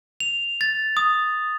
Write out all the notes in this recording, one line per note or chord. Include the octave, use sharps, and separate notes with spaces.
F7
A6
D#6